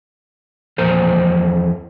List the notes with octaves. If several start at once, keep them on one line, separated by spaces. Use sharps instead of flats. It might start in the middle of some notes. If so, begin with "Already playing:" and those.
E2 F3 A#4 C5